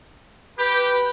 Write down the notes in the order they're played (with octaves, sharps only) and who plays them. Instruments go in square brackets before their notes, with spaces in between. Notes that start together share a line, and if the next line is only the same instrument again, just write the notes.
[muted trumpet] G4 [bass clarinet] B4